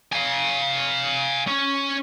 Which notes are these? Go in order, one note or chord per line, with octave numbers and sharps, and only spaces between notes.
F5 G#5
C#4